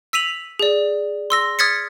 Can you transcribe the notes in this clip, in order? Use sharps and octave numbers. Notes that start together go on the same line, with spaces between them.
E6 B6 D#7 F7 F#7
G#4 D5
C6 E6 A#6
D#6 F6 G#6 A6 B6 C#7